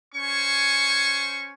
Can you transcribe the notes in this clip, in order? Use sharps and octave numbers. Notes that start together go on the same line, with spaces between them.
C#4 C5 G#5 C#6